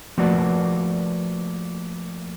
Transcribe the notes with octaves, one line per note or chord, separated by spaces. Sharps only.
F3 A3 A#3 F#4 B4 D5